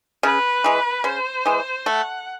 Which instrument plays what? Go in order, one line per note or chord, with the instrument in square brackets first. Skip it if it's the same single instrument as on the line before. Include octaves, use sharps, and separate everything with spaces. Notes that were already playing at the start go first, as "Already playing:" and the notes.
[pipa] C#3 [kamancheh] B4
[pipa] E3 G#3
[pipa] C#3 [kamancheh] C5
[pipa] E3 G#3
[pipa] A3 [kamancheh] F#5